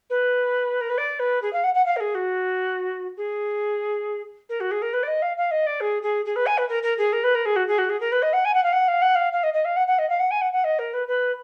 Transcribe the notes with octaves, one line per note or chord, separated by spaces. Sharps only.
B4
A#4
B4
D5
B4
G#4
F5
F#5
F#5
F5
A#4
G#4
F#4
G#4
A#4
F#4
G#4
A#4
B4
D5
D#5
F5
F5
D#5
D5
G#4
G#4
G#4
B4
G#5
B4
A#4
A#4
G#4
A#4
B4
A#4
G#4
F#4
G#4
F#4
G#4
A#4
B4
D#5
F#5
G#5
F#5
F5
F#5
F5
F#5
F5
F5
D#5
D#5
F5
F#5
F#5
D#5
F5
F#5
G#5
F#5
F#5
D#5
A#4
B4
B4